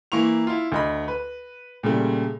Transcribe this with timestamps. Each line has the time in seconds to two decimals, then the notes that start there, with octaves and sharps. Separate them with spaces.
0.12 E3 A#3 E4 C#6 F7
0.47 E4 F4
0.72 D2 D#5 B5
1.08 B4
1.83 A#2 C#3 G3 A3